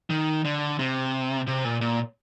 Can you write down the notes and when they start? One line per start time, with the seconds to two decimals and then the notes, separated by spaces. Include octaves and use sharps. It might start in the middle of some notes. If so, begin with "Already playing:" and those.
0.10 D#3
0.45 D3
0.79 C3
1.47 C3
1.64 A#2
1.81 A#2